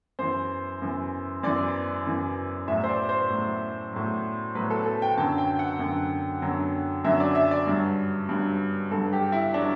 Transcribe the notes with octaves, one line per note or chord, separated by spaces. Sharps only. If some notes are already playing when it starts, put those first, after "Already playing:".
F#2 E3 C5
F#2 E3
F#2 E3 D5
F#2 E3
A2 F#3 E5
C5
D5
C5
A2 F#3
A2 F#3
A2 F#3 B4
A4
A4
G5
F#2 D3 F#3 A5
G5
F#5
F#2 D3 F#3
F#2 D3 F#3
F#2 D3 F#3 E5
D5
E5
D5
G2 F#3
G2 F#3
G2 F#3 A4
G4
E4
F#3 D4